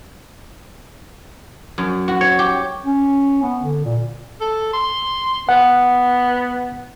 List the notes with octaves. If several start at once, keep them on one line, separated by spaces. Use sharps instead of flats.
F#2
F#4
C#5
G4
C#4
B3
D3
A#2
A4
C6
B3 F#5